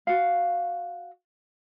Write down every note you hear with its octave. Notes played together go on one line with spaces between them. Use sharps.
F#4 F5